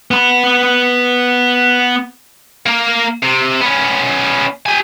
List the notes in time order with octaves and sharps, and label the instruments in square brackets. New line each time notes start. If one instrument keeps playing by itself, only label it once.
[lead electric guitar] B3 B5
[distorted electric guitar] A#3 A#4
C3
B3 C#4
G4 G#5